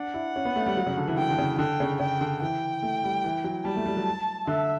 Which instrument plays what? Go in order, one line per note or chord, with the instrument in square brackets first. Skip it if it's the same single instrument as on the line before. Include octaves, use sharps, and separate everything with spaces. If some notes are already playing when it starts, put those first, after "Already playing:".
Already playing: [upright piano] D4 [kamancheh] F#5
[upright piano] E4
C#4
B3
A3
G3
F#3
C#3
D3
E3
[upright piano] D3 [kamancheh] G5
[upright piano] D3
C#3
[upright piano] D3 [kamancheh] G5
[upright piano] C#3
[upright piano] C#3 [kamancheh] G5
[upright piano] D3
[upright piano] E3 [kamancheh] G5
[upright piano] A3
G3
E3
F#3
[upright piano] G3 [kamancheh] A5
[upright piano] A3
G3
F#3
[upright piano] D3 [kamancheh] E5